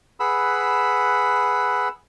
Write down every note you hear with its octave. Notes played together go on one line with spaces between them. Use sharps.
G#4 B4 F#5 B5 E6